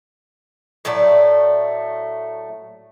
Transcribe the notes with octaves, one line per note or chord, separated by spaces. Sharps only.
A2 F#3 A3 D5